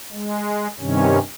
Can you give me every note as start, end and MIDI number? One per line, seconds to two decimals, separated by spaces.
0.12 0.68 56
0.79 1.19 43
0.79 1.19 48
0.79 1.19 51
0.79 1.19 61